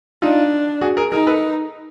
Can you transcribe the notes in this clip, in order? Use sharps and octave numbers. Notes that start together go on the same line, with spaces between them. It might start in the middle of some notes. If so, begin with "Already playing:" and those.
D4 D#4 F4
F#4 G#4
G#4 A#4
D#4 G#4 A#4
A4 B4